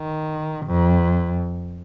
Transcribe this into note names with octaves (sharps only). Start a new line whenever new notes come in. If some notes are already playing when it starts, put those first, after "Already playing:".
Already playing: D#3
F2